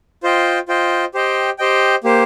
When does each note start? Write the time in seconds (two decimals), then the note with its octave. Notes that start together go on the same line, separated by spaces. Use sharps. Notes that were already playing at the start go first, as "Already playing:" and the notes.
0.23 F4 C5 D#5 G5
0.68 F4 C5 D#5 G5
1.14 G4 C5 D#5 G5
1.59 G4 C5 D#5 G5
2.04 A#3 G4 C5